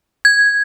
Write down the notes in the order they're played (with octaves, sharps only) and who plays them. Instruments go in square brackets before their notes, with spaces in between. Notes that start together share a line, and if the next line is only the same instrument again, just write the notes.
[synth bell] G#6